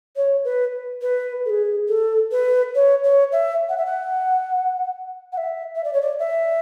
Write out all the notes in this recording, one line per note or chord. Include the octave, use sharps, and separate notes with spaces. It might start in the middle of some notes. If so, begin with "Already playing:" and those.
C#5
B4
B4
A4
G#4
A4
B4
C#5
C#5
E5
F#5
E5
F#5
F#5
E5
E5
D5
C#5
D5
E5